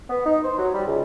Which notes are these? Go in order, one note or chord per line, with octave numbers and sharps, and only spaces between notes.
B3
D#4
C5
F#3
G3
C#2